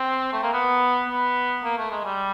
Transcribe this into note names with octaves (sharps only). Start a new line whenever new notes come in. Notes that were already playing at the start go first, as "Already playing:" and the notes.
Already playing: C4
A3
A#3
B3
B3
A#3
A3
G#3
G3